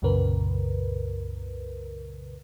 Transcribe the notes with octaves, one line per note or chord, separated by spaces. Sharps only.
C2 F#2 A#2 C#3 A#4 B4